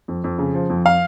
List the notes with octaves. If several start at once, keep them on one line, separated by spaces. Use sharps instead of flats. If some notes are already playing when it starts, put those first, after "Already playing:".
F2
F2
C#3
F3
F2
F5